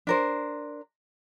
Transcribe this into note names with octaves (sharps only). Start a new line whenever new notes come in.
D4 A#4 C5